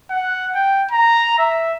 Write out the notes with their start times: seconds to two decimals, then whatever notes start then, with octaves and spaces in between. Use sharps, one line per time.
0.11 F#5
0.55 G5
0.91 A#5
1.39 E5